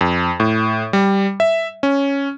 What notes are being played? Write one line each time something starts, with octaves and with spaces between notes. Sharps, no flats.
F2
A2
G3
E5
C#4